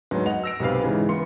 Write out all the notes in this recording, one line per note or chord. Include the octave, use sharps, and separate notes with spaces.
D2 G#2 F#3 B3
D#5 F#5 F7
E6 A#6 D7
B1 C3 B4 F5
G#2 C#3 E3
E3 B3 C6 C#7